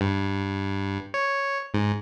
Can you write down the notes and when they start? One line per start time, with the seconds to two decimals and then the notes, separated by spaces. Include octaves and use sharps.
0.01 G2
1.14 C#5
1.74 G#2